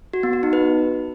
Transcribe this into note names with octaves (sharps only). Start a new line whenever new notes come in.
F#4
B3
F#4
D#4
B4